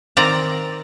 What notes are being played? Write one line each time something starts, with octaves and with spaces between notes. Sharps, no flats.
D#3 C4 D5 A#5